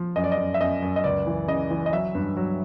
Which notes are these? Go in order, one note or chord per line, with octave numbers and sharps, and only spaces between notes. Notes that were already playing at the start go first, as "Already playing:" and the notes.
Already playing: F3
F#2 D#5
D5
D#5
F#2
E5
F#2 D#5
F#2
D#5
C#2 D5
E3
C#3 D#5
E3
D#5
F#3 E5
G2
F#3